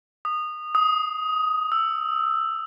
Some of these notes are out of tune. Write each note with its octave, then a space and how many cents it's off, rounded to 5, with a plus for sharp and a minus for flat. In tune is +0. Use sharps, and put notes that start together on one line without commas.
D#6 -20
D#6 +15
E6 +10